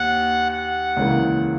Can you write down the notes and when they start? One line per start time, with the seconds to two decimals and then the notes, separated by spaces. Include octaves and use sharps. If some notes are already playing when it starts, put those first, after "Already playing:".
Already playing: D#2 F#5
0.50 F#5
0.97 C#2 C#3 E3 A#3